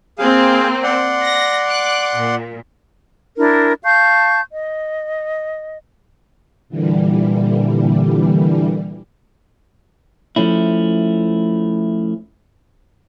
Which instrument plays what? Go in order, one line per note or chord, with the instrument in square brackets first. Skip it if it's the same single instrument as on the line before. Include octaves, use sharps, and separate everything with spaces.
[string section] A#3 C4 [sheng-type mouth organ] G#4 F5
[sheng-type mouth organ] D5 F#5 C6
[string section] A#6
D6 F#6
A#2
[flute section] D4 E4 A#4
F5 A5 C#6 G6
D#5
[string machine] A#2 D3 E3 G3
[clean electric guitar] F3 A3 C#4 E4